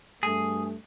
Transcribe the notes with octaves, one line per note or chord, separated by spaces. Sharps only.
G2 A3 G#4